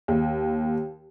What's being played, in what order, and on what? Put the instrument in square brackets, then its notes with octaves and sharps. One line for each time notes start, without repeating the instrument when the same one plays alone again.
[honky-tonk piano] D#2